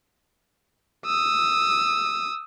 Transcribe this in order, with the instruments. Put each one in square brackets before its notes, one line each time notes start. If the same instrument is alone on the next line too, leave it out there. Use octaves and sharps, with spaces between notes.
[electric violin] D#6 E6